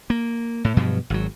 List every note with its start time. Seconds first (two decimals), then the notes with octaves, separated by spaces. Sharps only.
0.10 A#3
0.64 A2
0.77 G2 B2 F3 F#3
1.10 G#1 F#3